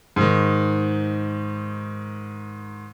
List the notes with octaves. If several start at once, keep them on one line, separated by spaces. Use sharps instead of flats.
G#2 D#3